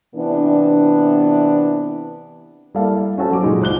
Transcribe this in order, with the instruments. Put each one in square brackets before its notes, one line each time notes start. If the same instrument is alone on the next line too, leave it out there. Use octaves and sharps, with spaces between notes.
[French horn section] C3 E3 B3 D4
[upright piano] G3 A#3 E4 A4 F5
C#4 F#4 A4 C5
F#3 D6
A#2 F3 G#3 D#4 F#4
C#2 C5 F#6 G7